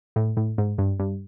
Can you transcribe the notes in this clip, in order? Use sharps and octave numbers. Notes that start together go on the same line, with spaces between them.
A2
A2
G#2
G2
G2